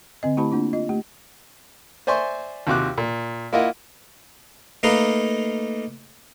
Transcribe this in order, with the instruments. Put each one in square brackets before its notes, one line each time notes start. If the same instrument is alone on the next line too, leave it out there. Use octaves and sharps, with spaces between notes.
[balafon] D3 C4 D#5
A3 E4 G4 C5 A5 B5
A#3 D4 F4
F4 D#5
A3 G4
[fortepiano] C5 D5 E5 G#5 C6 C#6
D#2 C3 F4 F#4 D6 F#6
A#2
A#3 E4 F4 D#5 F#5
[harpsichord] A3 A#3 D#4 B4 F5 A#5